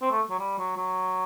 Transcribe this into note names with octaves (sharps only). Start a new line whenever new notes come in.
C4
A3
F#3
G3
F#3
F#3